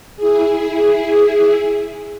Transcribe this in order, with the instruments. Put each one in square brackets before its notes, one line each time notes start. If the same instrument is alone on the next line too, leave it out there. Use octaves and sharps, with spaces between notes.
[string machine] E4 G#4